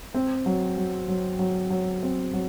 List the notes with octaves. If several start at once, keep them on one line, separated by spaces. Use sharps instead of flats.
C4
F#3
F#3
F#3
F#3
F#3
C4
F#3